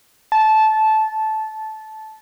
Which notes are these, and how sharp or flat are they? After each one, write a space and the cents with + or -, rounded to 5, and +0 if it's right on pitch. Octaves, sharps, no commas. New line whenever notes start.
A5 -15